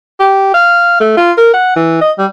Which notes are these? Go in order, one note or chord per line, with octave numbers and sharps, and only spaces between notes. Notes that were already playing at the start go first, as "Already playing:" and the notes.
G4
F5
A3
F4
A#4
F#5
E3
D#5
G3